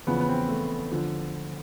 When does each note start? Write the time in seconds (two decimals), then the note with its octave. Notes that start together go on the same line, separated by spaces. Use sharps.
0.07 E2 C#3 F3 B3
0.20 B3
0.28 C4
0.49 A3
0.91 D3 F3